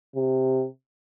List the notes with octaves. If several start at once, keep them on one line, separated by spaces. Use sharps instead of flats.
C3